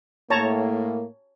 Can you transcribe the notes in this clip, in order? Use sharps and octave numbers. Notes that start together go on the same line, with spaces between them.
A2 A#3 C#5 A5 A#5